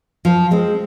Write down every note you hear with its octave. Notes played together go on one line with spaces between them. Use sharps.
F3
G#3 C4